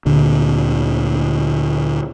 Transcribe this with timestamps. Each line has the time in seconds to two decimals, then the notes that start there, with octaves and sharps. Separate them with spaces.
0.06 D2 A#2 D3